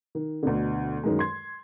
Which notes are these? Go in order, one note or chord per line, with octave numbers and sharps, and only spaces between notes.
D#3
D2 B2 D3
F#2 D#3 G#3
C6 G#6